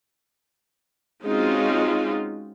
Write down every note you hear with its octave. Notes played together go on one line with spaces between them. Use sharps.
G#3 C4 C#4 D#4 F4 F#4